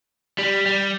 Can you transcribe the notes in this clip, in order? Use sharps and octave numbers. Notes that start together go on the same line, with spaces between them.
G3
G3